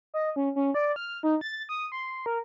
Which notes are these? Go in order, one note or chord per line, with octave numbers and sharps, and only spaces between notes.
D#5
C#4
C#4
D5
F6
D#4
A6
D#6
C6
A#4